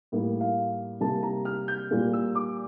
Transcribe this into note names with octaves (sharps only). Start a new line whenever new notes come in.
A2 G3 A#3
F5
C3 G3 A#3 A5
A#5
F6
G6
A#2 G3 A#3
E6
D6